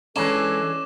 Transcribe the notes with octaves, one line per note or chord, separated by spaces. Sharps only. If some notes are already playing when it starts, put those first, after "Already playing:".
E3 G#3 C#4 D4 A4 D6 E7